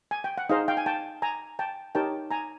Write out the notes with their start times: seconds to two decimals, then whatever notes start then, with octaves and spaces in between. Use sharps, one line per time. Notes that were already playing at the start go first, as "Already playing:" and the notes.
0.11 G#5
0.24 G5
0.38 F#5
0.49 D#4 G#4 C5 D#5 F5
0.68 F5 G5
0.77 G#5
0.86 G5 A5
1.22 G#5 A#5
1.59 G5 A5
1.95 D#4 G4 A#4 C#5 G5 A5
2.31 G#5 A#5